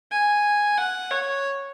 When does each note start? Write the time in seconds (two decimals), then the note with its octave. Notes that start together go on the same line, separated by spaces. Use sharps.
0.12 G#5
0.78 F#5
1.11 C#5